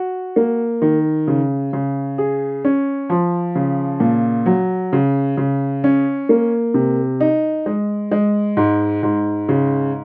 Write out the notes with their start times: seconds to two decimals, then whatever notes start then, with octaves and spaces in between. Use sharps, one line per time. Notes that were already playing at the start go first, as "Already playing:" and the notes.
Already playing: F#4
0.36 A#3
0.82 D#3
1.27 C#3
1.73 C#3
2.18 G#4
2.65 C#4
3.10 F3
3.55 C#3
4.00 A#2
4.46 F#3
4.93 C#3
5.37 C#3
5.84 C#4
6.29 A#3
6.74 C3
7.20 D#4
7.66 G#3
8.11 G#3
8.57 G#2
9.03 G#2
9.49 C#3